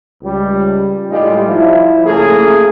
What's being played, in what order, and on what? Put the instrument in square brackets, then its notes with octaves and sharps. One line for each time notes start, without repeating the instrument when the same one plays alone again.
[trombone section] C#2 G3
A2 G3 G#3 D#4 F4
F3 E4
C#3 A3 A#3 G#4